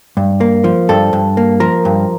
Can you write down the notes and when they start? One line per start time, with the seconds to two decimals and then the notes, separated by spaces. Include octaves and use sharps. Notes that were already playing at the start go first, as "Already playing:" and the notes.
0.17 G2
0.41 A#3
0.64 F3
0.89 G2 A4
1.13 G2
1.37 A#3
1.60 F3 A#4
1.85 G2